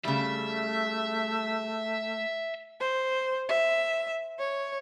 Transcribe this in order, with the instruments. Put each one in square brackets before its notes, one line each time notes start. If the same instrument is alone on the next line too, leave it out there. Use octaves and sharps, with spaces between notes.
[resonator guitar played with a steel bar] C#3 G3 [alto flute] A3 [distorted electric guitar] E5
[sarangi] C5
E5
C#5